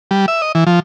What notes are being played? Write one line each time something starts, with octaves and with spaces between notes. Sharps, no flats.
G3
E5
D#5
E3
F3